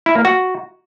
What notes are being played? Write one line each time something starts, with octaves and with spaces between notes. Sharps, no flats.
E4
A#3
F#4